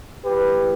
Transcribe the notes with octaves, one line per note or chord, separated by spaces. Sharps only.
A2 E3 G4 B4